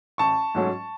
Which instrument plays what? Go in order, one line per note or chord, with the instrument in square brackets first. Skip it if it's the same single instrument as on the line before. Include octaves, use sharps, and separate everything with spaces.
[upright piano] A1 A5 C#6
G#2 F#3 A3 C#4